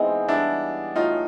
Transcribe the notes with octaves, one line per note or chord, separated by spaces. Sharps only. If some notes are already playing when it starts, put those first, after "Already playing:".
Already playing: E3 G#3 B3 C4 D#4
E3 G3 B3 D4 E4
A2 F#3 A3 D#4 F4